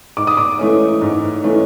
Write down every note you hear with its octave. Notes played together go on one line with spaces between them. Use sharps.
G#2 D6
D#6
D6
E3 A3 C#4
G#2
E3 A3 C#4